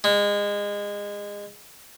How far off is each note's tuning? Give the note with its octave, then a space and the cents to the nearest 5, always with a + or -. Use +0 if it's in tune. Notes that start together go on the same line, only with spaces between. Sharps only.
G#3 -25